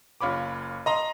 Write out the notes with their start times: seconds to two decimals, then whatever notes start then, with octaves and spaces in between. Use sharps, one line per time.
0.21 F#1 F4 C#5 B5 D6
0.86 D#5 A#5 C6